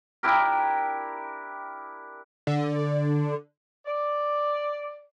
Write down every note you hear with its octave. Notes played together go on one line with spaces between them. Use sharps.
D4 E4 G4 A#4
D3
D5